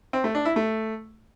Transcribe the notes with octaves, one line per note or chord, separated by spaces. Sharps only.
C4
A3
D4
E4
A3